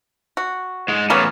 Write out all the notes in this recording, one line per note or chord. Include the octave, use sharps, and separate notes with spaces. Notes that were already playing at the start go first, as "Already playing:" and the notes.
F#4
G#2 G#3
E2 A2 A#3 B3 C#4